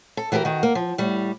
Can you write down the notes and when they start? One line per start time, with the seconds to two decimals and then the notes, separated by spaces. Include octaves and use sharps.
0.17 A4
0.32 E3 F#4 G4 A4 A#4
0.45 D#3 F#4
0.63 A#3
0.75 F3
0.98 A2 G3